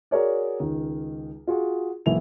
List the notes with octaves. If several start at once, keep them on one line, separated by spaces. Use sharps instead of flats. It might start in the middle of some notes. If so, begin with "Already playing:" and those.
F#4 G#4 A#4 C#5 D5
C#2 D#3
F4 F#4 G#4
B1 G#2 E3 A#3 E4 F7